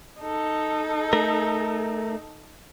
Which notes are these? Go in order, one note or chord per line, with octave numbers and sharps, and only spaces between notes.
D#4 A4
A3 A#4